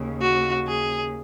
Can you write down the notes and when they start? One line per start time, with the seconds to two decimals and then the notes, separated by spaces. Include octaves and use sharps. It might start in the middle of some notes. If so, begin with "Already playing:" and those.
Already playing: D#2 C#3
0.21 F#4
0.67 G#4